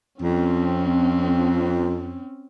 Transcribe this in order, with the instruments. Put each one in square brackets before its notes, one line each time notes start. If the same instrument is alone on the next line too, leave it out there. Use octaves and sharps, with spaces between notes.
[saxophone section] F2 [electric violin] C4 C#4